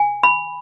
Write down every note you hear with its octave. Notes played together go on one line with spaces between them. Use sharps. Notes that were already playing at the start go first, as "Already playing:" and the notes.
Already playing: G#5
B5